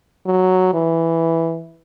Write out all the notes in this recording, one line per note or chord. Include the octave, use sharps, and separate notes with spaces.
F#3
E3